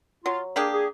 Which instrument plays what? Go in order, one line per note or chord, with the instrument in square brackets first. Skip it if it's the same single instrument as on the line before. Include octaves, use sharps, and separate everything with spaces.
[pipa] F#3 [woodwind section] F4
[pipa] A#3 D4 G4 [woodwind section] G#4
[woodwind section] G#4